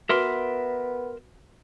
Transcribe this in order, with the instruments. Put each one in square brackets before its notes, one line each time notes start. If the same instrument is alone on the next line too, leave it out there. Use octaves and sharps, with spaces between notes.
[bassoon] B3 [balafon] F#4 B4 [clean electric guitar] A#4 E5 C6